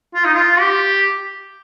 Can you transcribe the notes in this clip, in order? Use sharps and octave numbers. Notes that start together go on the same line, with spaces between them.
F4
D#4
F4
G4